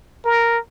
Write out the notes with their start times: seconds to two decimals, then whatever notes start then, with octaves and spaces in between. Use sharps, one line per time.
0.25 A#4